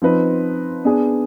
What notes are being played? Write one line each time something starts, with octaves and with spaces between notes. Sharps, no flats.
F3 C4 D#4 B4
B3 D4 G#4